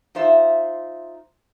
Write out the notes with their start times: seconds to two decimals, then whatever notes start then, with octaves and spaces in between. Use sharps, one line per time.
0.15 D#4 F4 C5 E5